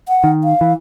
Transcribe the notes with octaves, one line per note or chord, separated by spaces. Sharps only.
F#5
D#3
F5
E3